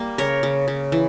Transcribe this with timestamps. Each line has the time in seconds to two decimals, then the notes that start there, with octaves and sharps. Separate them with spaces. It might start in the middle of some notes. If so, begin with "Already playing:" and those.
Already playing: G3 A#3
0.18 C#3 A#4 C#5
0.43 C#3
0.68 C#3
0.92 E3